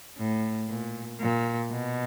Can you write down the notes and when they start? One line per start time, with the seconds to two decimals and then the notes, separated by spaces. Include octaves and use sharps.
0.17 A2
0.68 A#2
1.20 A#2
1.70 B2